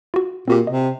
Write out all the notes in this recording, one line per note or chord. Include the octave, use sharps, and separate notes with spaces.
F4 F#4
A#2 C4 F#4 G4
C3 D#5